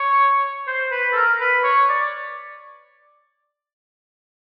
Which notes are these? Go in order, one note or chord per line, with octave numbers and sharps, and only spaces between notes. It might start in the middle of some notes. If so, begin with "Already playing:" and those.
Already playing: C#5
C5
B4
A4
A#4
B4
C#5
D5